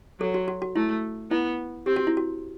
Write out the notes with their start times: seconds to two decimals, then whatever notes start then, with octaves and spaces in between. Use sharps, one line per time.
0.20 F#3 A4
0.34 F#4
0.48 F#4
0.62 F#4
0.75 A3 E4
1.31 B3 E4
1.86 C4 G4
1.96 F#4
2.07 E4
2.17 F#4